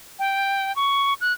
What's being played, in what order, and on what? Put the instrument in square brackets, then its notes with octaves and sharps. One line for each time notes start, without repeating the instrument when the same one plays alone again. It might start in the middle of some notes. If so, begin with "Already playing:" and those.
[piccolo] G5
C#6
F#6